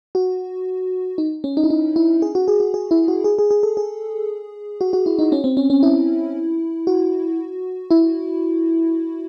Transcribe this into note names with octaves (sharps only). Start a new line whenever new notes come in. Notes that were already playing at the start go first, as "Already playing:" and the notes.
F#4
D#4
C#4
D#4
E4
D#4
E4
G#4
F#4
G#4
F#4
G#4
E4
F#4
G#4
G#4
G#4
A4
G#4
F#4
F#4
E4
D#4
C#4
C4
C#4
C#4
E4
F#4
E4